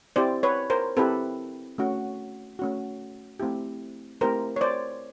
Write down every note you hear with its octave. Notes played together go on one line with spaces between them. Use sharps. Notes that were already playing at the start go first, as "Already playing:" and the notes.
C4 E4 G4 C5 D5
B4 C#5
A#4 C5
C4 E4 G4 A4 B4
A3 C#4 F#4
A3 C#4 F#4
A3 C4 E4 G4
A3 C4 E4 G4 A#4 C5
C#5
C5 D5